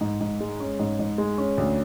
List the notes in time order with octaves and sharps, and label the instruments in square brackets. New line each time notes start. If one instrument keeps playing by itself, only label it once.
[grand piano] G#2
G#2
G#3
C#4
G#2
G#2
G#3
C#4
D2